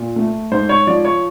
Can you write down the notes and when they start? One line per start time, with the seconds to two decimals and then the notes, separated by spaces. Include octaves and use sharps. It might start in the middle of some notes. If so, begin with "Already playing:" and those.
Already playing: A#2
0.16 A3
0.51 G#2 C5
0.69 C#5
0.87 F3 D5
1.05 C#5